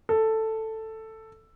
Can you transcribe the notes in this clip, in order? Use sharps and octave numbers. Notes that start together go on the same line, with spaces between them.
A4